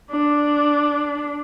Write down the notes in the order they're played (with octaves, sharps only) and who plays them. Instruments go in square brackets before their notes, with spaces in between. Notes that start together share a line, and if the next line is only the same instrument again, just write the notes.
[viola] D4